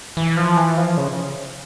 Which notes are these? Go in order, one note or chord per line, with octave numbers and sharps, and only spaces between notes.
E3
F3
E3
F3
C#3